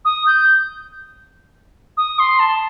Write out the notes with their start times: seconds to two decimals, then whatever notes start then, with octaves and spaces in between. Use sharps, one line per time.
0.05 D#6
0.27 G6
1.97 D#6
2.19 C6
2.39 A5